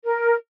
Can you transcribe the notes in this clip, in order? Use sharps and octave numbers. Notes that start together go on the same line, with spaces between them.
A#4